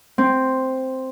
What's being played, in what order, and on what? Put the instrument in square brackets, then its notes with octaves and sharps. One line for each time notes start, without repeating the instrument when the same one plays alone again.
[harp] C4